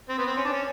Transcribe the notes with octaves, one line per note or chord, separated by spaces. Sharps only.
C4
B3
C4
C#4
D4
C#4